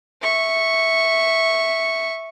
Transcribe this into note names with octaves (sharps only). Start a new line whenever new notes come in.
E5 C#6